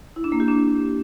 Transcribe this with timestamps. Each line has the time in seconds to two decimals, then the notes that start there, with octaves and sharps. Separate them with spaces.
0.16 E4
0.24 D4
0.32 A#3
0.40 G4
0.48 D4